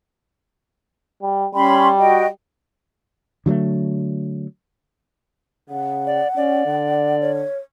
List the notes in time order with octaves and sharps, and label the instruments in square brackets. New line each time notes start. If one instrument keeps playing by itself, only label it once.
[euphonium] G3
[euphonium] G3 [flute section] C#4 B5 C6
[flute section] F#4 D#5 G5
[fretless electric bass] D3 F#3 G3 A3
[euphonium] C#3 [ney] F#5
[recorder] D5
[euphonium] C#4 [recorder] D5
[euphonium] D3
[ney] C#5